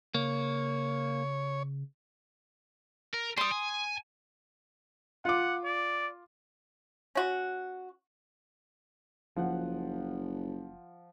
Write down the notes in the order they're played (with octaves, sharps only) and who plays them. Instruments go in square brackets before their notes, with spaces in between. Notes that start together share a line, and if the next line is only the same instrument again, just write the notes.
[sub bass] C#3 [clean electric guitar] A#3 [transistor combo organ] C#5
[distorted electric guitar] A#4
[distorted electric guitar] G3 [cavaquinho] C6 D#6
[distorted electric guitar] G#5
[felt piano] F4 D6 [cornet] F#5
[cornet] D5
[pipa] C#4 F#4
[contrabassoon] F#1 [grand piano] F3 F#5